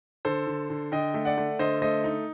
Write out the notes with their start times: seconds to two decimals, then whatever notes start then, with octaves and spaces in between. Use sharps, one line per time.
0.25 D3 A4 C5
0.47 D3
0.70 D3
0.92 D3 D#5 G5
1.14 A3
1.25 D5 F#5
1.37 A3
1.59 D3 C5 D#5
1.82 A3 C5 D#5
2.04 D#4